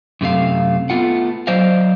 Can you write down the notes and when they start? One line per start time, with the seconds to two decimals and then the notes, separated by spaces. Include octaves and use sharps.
0.21 F#2 C3 A3 F5
0.90 A3 B3 F4 F#5
1.47 F#3 C5 D5 D#5 F5